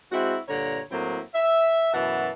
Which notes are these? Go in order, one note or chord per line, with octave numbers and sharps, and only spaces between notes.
G#3 C4 E4 F#4
G2 A#2 D3 C#5 A#5
A2 F#3 A#3 C4 E4
E5
F#2 B2 E3 F#5 A5